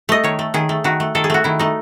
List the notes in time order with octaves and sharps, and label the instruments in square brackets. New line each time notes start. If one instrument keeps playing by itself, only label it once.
[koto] A3 D#5
D#3 C#5
A3
D#3 G#4
A3
D#3 F#4
A3
D#3 A4
G#4
A3 F#4
D#3 E4
A3 D#4